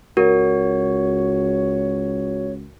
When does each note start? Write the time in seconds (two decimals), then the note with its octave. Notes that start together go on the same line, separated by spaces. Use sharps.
0.17 C#2 F#4 A#4 C#5